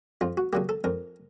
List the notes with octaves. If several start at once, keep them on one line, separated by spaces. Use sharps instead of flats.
F2 F4
F#4
C#3 F#3 A#3 G4
A4
F2 A#4